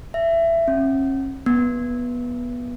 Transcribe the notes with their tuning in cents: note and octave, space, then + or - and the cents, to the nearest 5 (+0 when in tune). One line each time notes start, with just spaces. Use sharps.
E5 +20
C#4 -40
B3 -15